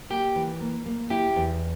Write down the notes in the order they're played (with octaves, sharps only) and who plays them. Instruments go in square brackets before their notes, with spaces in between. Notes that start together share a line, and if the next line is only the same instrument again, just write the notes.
[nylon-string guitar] A#3 [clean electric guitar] G4
[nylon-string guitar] E3
A#3
A#3
[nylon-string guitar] E4 [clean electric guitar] G4
[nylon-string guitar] E2